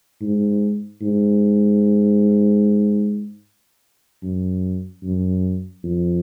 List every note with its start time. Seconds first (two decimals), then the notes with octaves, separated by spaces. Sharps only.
0.21 G#2
1.02 G#2
4.23 F#2
5.03 F#2
5.83 F2